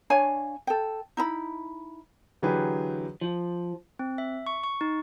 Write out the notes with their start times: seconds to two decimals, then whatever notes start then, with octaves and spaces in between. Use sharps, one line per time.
0.10 D4 C#5 F5 G#5
0.67 A4 G5
1.17 D#4 E4 B5
2.42 D3 E3 F#3 G4 G#4 B4
3.21 F3
3.99 C4
4.18 E5
4.47 C#6
4.63 C#6
4.81 D#4